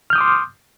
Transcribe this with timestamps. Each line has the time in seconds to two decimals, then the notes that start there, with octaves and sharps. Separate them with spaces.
0.10 F6
0.13 G6
0.15 D#6
0.18 D6
0.21 C6